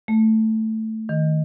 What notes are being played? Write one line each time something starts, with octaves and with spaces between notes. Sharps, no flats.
A3
D#3